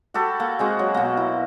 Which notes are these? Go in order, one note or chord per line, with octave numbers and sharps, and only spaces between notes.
F#4 G4 A4 B5
A#3
G#3 C4 F#4
F#3
B2 A#3
E4